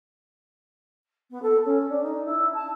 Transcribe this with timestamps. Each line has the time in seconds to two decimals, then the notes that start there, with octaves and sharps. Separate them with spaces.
1.30 B3
1.42 A4
1.65 C#4
1.89 D4
2.03 D#4
2.25 E4
2.54 A5